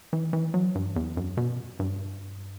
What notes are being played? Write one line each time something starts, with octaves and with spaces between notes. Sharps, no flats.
E3
E3
F#3
G2
E2
F#2
B2
G2